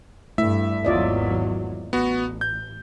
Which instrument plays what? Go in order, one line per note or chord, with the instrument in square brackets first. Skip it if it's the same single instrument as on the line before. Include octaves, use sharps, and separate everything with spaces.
[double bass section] G2 [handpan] A3 E4 [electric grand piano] E5
[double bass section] G#1 E2 F#3 [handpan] F4 D5 D#5
[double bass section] A1 [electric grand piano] B3 F#4
[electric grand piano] G6